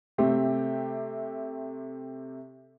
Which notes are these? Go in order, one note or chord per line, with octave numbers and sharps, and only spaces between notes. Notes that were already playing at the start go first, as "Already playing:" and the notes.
C3 A3 C4 G4